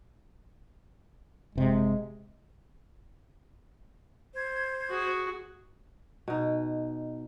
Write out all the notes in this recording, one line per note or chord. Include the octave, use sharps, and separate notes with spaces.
F#1 C3 G#3
C5 G#6
F#4 G#4
B2 D#4